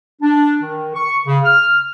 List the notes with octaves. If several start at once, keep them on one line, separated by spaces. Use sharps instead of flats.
D4
D#3
C#6
C#3
F6